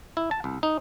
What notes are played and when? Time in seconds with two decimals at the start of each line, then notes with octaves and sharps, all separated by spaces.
0.17 E4
0.31 A5
0.44 C2
0.63 D#4